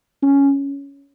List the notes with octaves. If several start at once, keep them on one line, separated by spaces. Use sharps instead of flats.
C#4